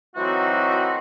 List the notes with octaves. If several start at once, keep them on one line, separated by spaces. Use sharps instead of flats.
E3 F#3 A3 C4 D#4 F#4